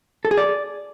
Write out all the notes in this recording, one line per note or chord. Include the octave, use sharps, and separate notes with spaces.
A4
G#4
D5